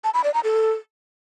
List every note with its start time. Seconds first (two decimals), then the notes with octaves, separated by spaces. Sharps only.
0.04 A5
0.14 B5
0.24 D5
0.34 A#5
0.44 A4